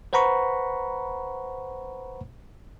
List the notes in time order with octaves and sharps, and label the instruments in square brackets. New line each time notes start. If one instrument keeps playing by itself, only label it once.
[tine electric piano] B4 C5 F#5 A#5 B5 C#6